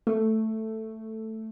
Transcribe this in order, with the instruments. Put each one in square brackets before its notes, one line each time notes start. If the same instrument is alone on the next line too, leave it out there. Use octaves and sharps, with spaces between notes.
[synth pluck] A3